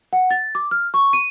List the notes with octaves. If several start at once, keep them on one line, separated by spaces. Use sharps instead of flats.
F#5
A6
D6
F6
C#6
D#7